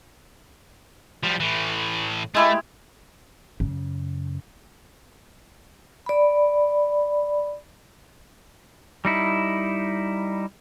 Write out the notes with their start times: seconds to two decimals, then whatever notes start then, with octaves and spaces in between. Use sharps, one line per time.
1.23 F3 G3
1.40 A2 E3
2.35 G#3 A3 E4 G4
3.60 F#2 C#3
6.06 D5 B5
9.05 G3 D#4 E4